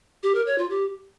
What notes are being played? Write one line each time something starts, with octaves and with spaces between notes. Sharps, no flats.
G4
A#4
C#5
F4
G4